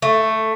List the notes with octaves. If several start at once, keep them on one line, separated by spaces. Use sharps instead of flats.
A3